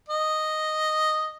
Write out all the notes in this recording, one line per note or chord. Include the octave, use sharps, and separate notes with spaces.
D#5